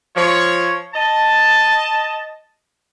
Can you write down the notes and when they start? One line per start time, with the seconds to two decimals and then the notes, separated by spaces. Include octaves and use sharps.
0.17 F3 C#5
0.94 D#5 A5